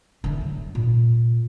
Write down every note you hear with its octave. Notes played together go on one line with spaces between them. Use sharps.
D3 A3
F#2
A#2